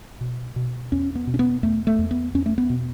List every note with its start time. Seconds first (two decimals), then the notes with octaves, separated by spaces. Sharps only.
0.21 B2
0.56 B2
0.92 E2 C#4
1.15 B3
1.27 B2
1.34 C#4
1.39 B3
1.63 E2 A3
1.87 A3
1.99 E2
2.11 B3
2.34 E2 C#4
2.46 A3
2.58 B3
2.70 B2